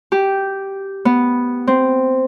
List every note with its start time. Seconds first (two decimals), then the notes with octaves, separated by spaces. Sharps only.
0.12 G4
1.05 B3
1.67 C4